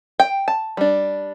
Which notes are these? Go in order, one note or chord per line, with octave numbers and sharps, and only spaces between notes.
G5
A5
G3 D4